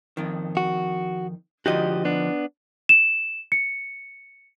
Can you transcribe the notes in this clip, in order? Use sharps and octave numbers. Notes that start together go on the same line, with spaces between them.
F2 D#3
F#4
D3 F3 D#4 F#4 G4 D#5
B3 D4
E7
C#7